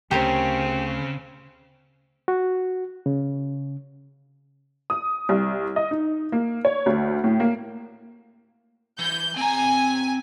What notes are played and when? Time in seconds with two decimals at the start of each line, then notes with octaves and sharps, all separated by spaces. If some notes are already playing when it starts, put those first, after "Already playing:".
0.11 D2 C#3 C4 G4 A#4 C#5
2.28 F#4
3.06 C#3
4.90 D#6
5.29 C2
5.76 D#5
5.91 D#4
6.32 A#3
6.65 C#5
6.86 D2
7.24 A2
7.40 A#3
8.99 E3 G6
9.36 C4 G#5 A#5